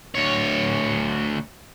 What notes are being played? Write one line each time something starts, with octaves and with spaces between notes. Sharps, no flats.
D2 C#5